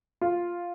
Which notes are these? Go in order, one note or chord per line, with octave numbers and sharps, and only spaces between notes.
F4